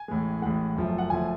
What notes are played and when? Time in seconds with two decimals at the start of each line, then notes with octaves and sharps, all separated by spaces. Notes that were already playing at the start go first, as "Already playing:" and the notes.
Already playing: G#5
0.08 A1 A2 G#3
0.42 A1 A2 G#3 F#5
0.76 F#1 F#2 F3 A3
0.98 F#5
1.10 F#1 F3 A3 G#5